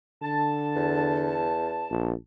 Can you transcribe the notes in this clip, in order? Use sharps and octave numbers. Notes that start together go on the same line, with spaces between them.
D3 A5
E2
A#1